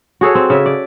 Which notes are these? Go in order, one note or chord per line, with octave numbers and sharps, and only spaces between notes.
F#4 G#4 A4 C#5
C4
C#3 E5
D5